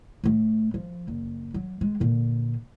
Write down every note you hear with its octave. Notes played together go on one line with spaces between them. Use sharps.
A2 A3
F3
F#1
F#3
G#3
A#2 D3